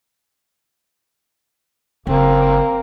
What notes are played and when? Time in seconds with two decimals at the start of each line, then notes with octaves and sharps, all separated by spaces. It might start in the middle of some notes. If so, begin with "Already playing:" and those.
2.07 F#1 A#3 C4